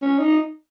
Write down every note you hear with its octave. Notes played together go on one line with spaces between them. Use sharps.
C#4
D#4